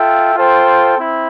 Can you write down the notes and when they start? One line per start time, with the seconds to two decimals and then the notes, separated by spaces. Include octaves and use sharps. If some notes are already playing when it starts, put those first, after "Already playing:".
Already playing: F4 A4 E5 G5
0.35 F4 A4 C5 G5
0.98 C4 E4